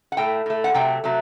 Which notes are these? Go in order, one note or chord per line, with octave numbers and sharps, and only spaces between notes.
F#5
A2 A3 G5
A2 A3
F#5
C3 F#3 A3 G5
C3 F#3 A3